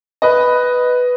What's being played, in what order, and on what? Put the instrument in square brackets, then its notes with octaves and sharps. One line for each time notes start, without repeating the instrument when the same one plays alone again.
[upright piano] B4 D#5